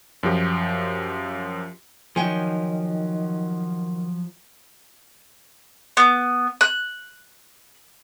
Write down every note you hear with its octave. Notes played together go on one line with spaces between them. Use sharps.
F#2 F3 G4
D#3 F3 F#3 C#5 G5 G#5
B3
F#6